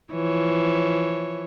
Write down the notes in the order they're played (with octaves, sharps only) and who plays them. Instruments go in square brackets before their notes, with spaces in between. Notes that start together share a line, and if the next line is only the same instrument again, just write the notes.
[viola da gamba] E3 F3 C#5